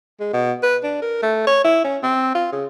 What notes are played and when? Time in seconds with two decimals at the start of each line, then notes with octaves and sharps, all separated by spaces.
0.20 G#3
0.33 B2
0.63 B4
0.84 D4
1.02 A#4
1.23 A3
1.47 C#5
1.65 E4
1.84 C#4
2.03 C4
2.35 F4
2.52 C#3